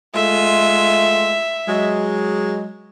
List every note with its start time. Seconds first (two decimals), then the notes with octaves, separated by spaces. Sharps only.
0.15 G#3 A3 F4 E5
1.68 F#3 G#3